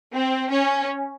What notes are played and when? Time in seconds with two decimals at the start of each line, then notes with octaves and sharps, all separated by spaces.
0.14 C4
0.51 C#4